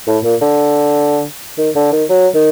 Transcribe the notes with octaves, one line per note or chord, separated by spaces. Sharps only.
A2
A#2
D3
D#3
D3
D#3
F#3
D#3